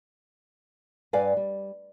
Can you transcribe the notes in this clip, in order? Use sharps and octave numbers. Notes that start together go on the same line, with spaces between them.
G2 B4 D5 F5 G#5
G3